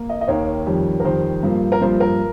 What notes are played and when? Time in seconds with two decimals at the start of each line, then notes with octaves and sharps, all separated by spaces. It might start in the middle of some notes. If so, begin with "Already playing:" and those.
Already playing: A#3
0.09 D#5
0.21 D#5
0.28 D#2 D#3 A#3 C#5
0.66 F2 D#3 G3
1.00 A#4
1.04 F2 D#3 G3 C5
1.43 G2 F3 A#3
1.72 A#4
1.81 G2 F3 A#3 C5
2.00 A#4